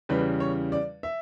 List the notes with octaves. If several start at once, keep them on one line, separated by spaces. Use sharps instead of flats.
E2 C#3 G3 B4
C#5
D5
E5